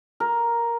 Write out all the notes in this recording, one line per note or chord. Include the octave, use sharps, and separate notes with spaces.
A#4